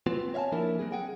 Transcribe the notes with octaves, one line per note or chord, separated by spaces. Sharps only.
B3 C4 F4
C#5 E5 F5 G#5 A5
F3 A#3 D4 E4 A#4
F#3 C4 G#4
G#4 F#5 G5